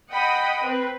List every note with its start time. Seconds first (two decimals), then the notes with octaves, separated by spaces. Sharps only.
0.11 D#5 F#5 G5 B5 D#6
0.64 C4 B4